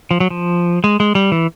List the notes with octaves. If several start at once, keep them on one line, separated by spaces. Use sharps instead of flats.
F3
F#3
F3
G#3
G#3
G3
E3